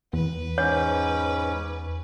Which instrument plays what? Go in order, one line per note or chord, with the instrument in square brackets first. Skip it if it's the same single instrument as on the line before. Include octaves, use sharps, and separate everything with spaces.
[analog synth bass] E2 [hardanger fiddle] B4
[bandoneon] G#2 C#4 D6 [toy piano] C#5